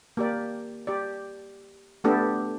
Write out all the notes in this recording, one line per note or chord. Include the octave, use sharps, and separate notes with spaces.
A#3 G4 D5
G4 D5
A3 B3 D4 G4 A4